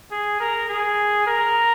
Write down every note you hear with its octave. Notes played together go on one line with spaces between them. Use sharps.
G#4
A#4
G#4
A#4